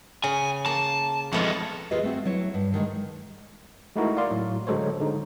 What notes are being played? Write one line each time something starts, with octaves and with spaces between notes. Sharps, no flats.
C#3 G#5
A#3 A5
F2 G#3 A3 B3 F4
D#2 F4 G#4 B4 D#5
A3 C4 F#4
F#3 E4 C#5
G2
D3 D#3 F3 G#3
G#3 A3 D#4 E4 F#4 A#4
D5 F5 C6
A2 F#3
D3 F#3 G#3 A4 C5 C#5
D3 G#3 D#4